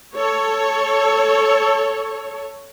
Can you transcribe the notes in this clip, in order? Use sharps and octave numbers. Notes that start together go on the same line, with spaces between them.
A4 C#5